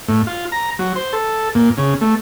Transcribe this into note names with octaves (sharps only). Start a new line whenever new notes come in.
A2
F4
A#5
F#3
C5
A4
A#2
C#3
A3